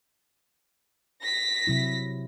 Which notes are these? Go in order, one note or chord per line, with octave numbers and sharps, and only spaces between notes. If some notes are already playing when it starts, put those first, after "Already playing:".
A#6 B6
C3 F#3 E4